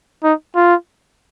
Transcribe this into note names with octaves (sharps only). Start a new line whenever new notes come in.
D#4
F4